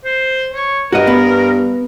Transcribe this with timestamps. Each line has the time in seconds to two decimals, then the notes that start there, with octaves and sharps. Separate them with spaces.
0.04 C5
0.53 C#5
0.93 G2 F#4 A#4 D#5
1.07 B3